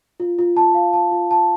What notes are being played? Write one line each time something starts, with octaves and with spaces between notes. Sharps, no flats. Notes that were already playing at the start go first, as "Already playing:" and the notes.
F4
F4
A5
F5
A5
F4
A5